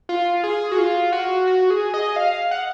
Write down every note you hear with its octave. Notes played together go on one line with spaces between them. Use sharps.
F4
G#4
F#4
F4
F#4
F#4
G#4
D#5
F5
F#5